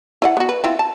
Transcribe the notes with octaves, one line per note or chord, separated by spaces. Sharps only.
E4 D#5 F#5
B3 F#4
B4
C4 E4 F4
A5